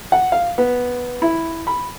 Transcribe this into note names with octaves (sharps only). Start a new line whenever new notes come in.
F#5
F5
B3
E4
B5